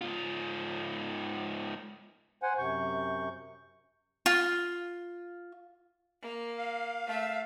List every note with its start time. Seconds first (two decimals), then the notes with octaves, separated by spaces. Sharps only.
0.01 G#2 F4
2.43 C5 F#5 G#5
2.58 F#2 C3 C#6 G6
4.26 F4
6.22 A#3
6.57 F5
7.07 A3 E5